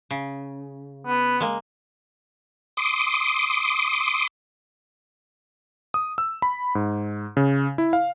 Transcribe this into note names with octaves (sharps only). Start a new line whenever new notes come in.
C#3
B3
G#3 A#3
C6 D6 D#6
D#6
E6
B5
G#2
C#3
E4
F5